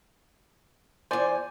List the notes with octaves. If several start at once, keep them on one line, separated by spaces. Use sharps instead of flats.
E2 C5 D5 G#5